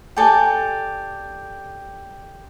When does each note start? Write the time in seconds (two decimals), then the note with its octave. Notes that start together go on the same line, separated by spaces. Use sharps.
0.17 G4 A4 D5 G#5